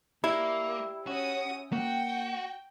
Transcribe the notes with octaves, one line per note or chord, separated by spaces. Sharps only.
A#3 E4 G4 D5
C#4 F#4 D#6
A#3 F#4 G5